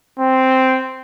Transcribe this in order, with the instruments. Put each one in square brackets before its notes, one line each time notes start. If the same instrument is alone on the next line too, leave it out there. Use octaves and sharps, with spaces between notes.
[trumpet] C4